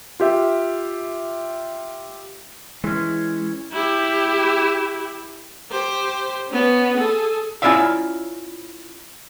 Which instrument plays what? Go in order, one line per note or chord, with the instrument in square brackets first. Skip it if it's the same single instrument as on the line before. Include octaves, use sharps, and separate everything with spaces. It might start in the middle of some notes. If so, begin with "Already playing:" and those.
[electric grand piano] F4 G4 E5
[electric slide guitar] E3 C#4 [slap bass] G#3
[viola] E4 G4
G4 C5
B3 C#4
G#4 A4
[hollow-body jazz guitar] C#4 E4 F4 D5 E5 F5